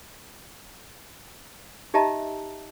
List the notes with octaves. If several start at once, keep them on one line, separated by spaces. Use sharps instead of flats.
D#4 G4 D#5 E5 A5 A#5